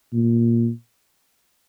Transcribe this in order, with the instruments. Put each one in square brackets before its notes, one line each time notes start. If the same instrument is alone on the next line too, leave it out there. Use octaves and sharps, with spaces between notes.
[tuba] A#2